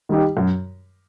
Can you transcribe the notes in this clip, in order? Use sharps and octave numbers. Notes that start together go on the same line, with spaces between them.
D#3 G3 D#4 G4
F#2